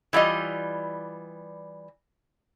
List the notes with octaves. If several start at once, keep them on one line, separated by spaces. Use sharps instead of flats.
E3 G3 F4 D#5